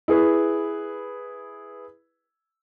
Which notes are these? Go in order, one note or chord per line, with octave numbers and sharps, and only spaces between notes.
E4 G#4 B4